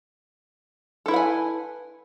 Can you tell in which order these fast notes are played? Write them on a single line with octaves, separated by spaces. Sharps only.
A4 E4 B4 F#5 G#5